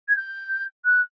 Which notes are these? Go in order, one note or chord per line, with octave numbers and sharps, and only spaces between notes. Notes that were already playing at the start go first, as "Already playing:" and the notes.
G#6
G6
F#6